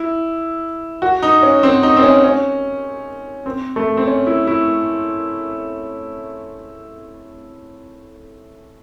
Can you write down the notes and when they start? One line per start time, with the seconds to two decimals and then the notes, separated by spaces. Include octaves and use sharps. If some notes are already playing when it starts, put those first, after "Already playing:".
Already playing: E4
1.02 F#4
1.23 D#4
1.43 C#4
1.63 C4
1.83 D#4
1.97 C4
2.03 C#4
2.24 C#4
3.46 C4
3.76 A3
3.97 C4
4.07 C#4
4.27 E4
4.47 E4